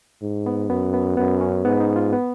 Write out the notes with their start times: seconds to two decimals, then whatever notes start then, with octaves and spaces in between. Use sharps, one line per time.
0.22 G#2
0.46 B3
0.70 F#2 B3
0.94 B3
1.17 F#2 B3
1.41 C#4
1.64 G#2 B3
1.81 D#4
1.96 F4
2.13 B3